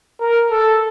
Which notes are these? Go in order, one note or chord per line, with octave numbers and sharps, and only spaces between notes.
A#4
A4